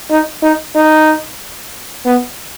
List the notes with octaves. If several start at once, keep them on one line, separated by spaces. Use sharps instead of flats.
D#4
D#4
D#4
B3